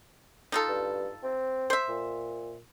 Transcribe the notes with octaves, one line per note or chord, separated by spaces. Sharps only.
D#4 F4 A4
G2
C4
C5 E5
A#2